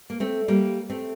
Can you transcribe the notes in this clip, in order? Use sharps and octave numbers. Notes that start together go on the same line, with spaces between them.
A#3
A3 C4
G3 A#3
A3 C4